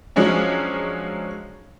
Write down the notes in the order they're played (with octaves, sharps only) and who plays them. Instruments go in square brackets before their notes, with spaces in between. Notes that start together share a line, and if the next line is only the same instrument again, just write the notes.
[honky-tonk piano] F3 F#3 G#3 C#4 D4